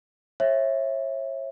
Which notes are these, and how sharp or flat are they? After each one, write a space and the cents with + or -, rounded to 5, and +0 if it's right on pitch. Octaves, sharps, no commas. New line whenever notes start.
C#5 -35 E5 +0